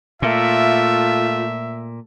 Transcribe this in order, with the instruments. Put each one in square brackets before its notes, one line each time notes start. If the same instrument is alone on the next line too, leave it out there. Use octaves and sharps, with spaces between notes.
[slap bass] A#2 [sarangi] A3 [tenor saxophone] F4 [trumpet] E5